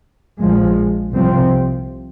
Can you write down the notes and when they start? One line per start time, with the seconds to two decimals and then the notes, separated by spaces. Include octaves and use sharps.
0.40 A#1 A#2 F3 G#3
1.13 C2 C3 F3 C4